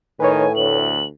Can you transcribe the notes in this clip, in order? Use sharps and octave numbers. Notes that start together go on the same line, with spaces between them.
A2 D#3 B4 C#5 G#5
D2 F#7